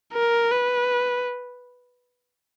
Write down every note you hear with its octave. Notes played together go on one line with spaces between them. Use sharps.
A#4
B4